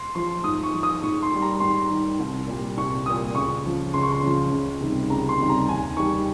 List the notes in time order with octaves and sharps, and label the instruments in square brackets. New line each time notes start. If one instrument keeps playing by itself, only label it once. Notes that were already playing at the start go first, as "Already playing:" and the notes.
Already playing: [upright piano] C6
F3 C6
G#2 D#6
C#6
F3
D#6
G#2 C#6
C6
D#3 G3
A#5
G#2 C6
D#3 G3
C2
A#2 G3
C2 C#6
A#2 G3 D#6
C#2 C#6
C#3 F3
C#2 C6
C#6
C6
C#3 F3
C#2
C3 D#3 G3
C#2 A#5
C6
C3 D#3 G3
A#5
D#2 G#5
D#3 G3 C#6